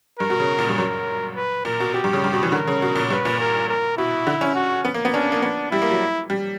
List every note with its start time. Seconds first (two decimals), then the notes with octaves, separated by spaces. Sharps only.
0.19 G2 A#4
0.30 B2
0.40 C#3
0.59 A#2
0.69 G2
0.78 F#2 A#4
1.36 B4
1.65 A#2 A#4
1.80 B2
1.94 B2 G4
2.04 G2
2.13 C#3
2.24 G2
2.33 B2
2.43 E3
2.52 D3 A#4
2.67 C#3
2.82 B2
2.95 A#2
3.10 G2 B4
3.25 A#2
3.40 A#4
3.69 A#4
3.98 B2 E4
4.27 D3
4.41 C#4
4.55 F#4
4.85 B3
4.94 A#3
5.05 B3
5.14 C#4 D4
5.32 A#3
5.42 B3 D4
5.71 G3 E4
5.82 A#3
5.91 F#3
6.30 G3